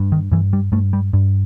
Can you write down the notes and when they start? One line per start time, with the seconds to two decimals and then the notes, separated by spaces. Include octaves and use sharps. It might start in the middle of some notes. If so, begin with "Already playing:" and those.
Already playing: G2
0.12 D#3
0.32 G2 E3
0.53 G3
0.72 G2 A3
0.93 G3
1.13 G2